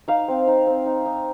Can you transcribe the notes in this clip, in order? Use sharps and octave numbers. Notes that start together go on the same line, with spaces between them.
D#4 F5
C4
D#4
C4
D#4
D#4